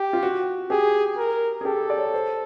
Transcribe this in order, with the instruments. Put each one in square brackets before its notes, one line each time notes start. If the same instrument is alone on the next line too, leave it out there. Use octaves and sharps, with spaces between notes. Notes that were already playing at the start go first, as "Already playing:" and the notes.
Already playing: [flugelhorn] G4
[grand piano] F4
F#4
[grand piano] G4 [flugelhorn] G#4
[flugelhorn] A#4
[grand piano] G#4
[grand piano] G4 [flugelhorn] A4
[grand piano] D5
C#5
C5